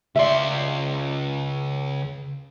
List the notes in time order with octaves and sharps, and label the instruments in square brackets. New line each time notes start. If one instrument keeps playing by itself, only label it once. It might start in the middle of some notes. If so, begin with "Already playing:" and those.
[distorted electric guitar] C#2 C6 [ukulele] D5 E5